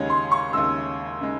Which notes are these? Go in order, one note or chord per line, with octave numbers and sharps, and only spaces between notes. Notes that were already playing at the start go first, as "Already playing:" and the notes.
Already playing: D#2 C#3 G#3 C#5
C6
C#6
D#2 C#3 G#3 E6
C#3 G#3